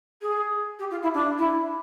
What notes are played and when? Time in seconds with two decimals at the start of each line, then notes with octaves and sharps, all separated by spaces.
0.22 G#4
0.79 G4
0.91 F4
1.03 E4
1.14 D4
1.38 E4